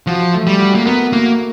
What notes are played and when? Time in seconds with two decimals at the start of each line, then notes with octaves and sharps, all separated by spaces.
0.07 F3 F#4
0.33 A3
0.47 G3
0.60 F#4
0.75 A#3
0.86 B3 A#4
1.12 A#3 F#4